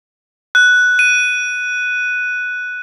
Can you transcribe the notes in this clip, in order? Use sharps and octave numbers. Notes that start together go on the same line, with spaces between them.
F#6
D#7